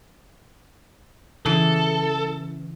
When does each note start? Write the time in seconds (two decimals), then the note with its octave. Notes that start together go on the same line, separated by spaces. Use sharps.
1.46 C#3 E3 A4